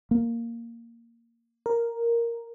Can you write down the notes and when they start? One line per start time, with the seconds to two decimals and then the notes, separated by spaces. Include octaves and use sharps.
0.11 A#3
1.66 A#4